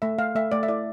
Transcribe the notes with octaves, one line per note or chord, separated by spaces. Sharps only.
A3 E5
A3 F5
A3 E5
A3 D5
E5
E4 D5